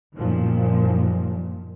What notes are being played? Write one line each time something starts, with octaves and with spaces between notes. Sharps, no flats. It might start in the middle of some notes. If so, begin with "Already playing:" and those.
G1 F#2 A#2 D#3 F3